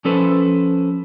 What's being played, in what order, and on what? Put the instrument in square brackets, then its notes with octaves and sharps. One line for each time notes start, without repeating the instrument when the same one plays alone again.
[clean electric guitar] F3 C#4 A4 B4 C5